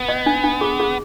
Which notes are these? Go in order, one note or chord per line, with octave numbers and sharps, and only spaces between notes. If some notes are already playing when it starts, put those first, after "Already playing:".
Already playing: B3
D#5
D4
D4
G#4
G#4